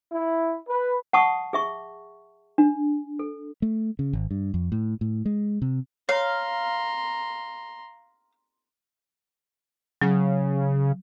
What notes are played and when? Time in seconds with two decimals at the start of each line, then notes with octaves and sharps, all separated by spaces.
0.12 E4
0.68 B4
1.13 F#5 A5 C#6 D#6
1.53 G#4 E5 C#6
2.58 D4
3.19 A4
3.62 A3
3.99 C#3
4.13 G#1
4.31 G2
4.54 F2
4.72 A2
5.01 A2
5.25 G#3
5.62 C3
6.09 C#5 F5 A#5 C6
10.02 C#3 F#3